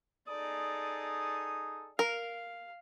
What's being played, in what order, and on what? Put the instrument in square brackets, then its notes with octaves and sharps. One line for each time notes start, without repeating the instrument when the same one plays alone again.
[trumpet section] D#4 G#4 A4 [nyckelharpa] D5 [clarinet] D#6
[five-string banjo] A#4 [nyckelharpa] F5